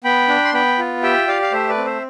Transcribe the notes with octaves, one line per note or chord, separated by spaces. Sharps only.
B3 G5 B5
D4
C6
B3 G5 B5
F4
G4 E5 G5
G4 D5 F5
F5
A3 C5 E5
B4 D5
C4
C5 E5